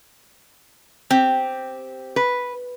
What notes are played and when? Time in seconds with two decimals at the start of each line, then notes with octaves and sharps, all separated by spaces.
1.11 C4 G4
2.16 B4